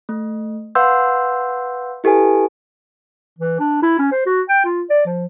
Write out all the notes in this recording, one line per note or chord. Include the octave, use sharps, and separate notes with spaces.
A3
B4 F5 F#5 C6 E6 G6
E4 G4 A4 B4 G#5
E3
D4
E4
C#4
C5
F#4
G5
F4
D5
F3